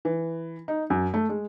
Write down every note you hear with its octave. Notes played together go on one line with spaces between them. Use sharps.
E3
D#4
F#2
A3
G#3